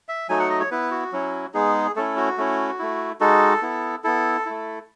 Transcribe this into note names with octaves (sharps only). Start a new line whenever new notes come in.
E5
F#3 A3 D#4 G#5
F#5
D#5
C#5
B3 E4 B4
F#4
F#3 C#4 E4
G#3 B3 D#4 G#4
A3 C#4 E4 A4
F#4
A3 C#4 E4
A3 E4
G#3 D#4 F#4 A4
B3 E4
B3 E4 A4
A3 E4